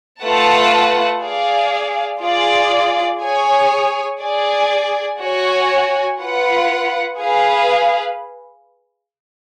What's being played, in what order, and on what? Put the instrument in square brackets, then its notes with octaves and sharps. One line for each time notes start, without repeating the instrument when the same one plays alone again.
[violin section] A3 F4 B4 F#5 A5
G#4 D5 F5
F4 G#4 D5
G#4 C#5 G#5
G#4 D5 G#5
F#4 C#5 G#5
F4 B4 F#5
G#4 B4 F5